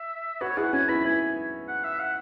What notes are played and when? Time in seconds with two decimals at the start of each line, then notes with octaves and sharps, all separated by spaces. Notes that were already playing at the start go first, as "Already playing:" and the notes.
Already playing: E5
0.41 F#4 B4 C#5
0.57 E4 G#4 F#5
0.73 C#4 F#4 G#5
0.89 B3 E4 B5
1.05 B3 E4 G#5
1.68 F#5
1.84 E5
2.00 F#5